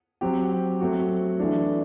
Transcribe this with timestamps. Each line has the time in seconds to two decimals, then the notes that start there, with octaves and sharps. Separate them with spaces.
0.21 F#3 C4 G4
0.81 F#3 A3 C4 F#4
1.39 E3 A3 D4